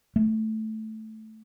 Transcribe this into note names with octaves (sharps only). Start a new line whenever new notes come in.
A3